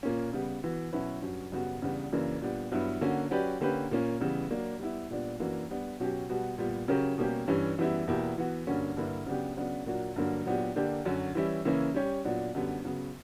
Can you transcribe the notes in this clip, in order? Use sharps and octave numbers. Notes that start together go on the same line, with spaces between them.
A#2 A#3 C#4
C#3 G3 B3
E3 B3 F#4
B2 F#3 C#4 E4 B4
G2 F#3 C#4
F#2 C#3 G3 B3 F#4
E2 C#3 G3 B3 D4
F#2 C#3 E3 A#3 D4
A#2 G3 B3 D4
G2 F#3 B3 E4
D3 A#3 C#4 F#4
F#3 C#4 G4 B4 D5
D3 A#3 C#4 G4 B4
A#2 A#3 C#4
C#3 E3 G3 B3
F#3 A#3 D4
G3 B3 E4
A#2 G3 B3 D4
F#2 E3 A#3 D4 F#4
G3 B3 D4
B2 F#3 C#4 G4
B2 G3 B3 F#4
A#2 G3 B3
C#3 F#3 C#4 G4 A#4
B2 G3 A#3 C#4 G4
G2 E3 G3 C#4
F#2 E3 G3 B3 E4
E2 B2 A#3 E4 G4
E3 B3 F#4
G2 D3 A#3 C#4 F#4
G2 D3 A#3 E4 B4
C#3 F#3 B3 D4 G4
C#3 F#3 B3 D4
A#2 F#3 A#3 D4 F#4
G2 D3 F#3 A#3
A#2 F#3 B3 D4 G4
D3 A#3 D4 G4
F#2 D3 F#3 C#4 F#4
E3 G3 C#4 E4
C#3 E3 A#3 C#4 E4
G3 C#4 G4 C#5
A#2 F#3 B3 D4
F#2 D3 G3 B3
C#3 F#3 B3